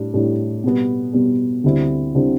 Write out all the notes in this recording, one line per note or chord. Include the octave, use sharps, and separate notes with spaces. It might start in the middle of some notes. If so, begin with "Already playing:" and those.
Already playing: A2 G3 D4
A2 G3 D4
B2 G3 B3
B2 G3 B3
D2 D3 G3 C4 E4
D3 G3 C4 E4